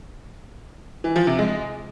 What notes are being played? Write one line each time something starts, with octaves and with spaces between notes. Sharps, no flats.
E3
F3
C3
G#3